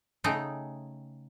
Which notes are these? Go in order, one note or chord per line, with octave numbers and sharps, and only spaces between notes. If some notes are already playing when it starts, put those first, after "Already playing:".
C#3 A3 D#4 G#4 G5